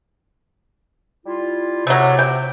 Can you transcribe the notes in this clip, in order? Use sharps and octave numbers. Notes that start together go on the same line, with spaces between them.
G3 E4 F4
C3 F#3 A3
G5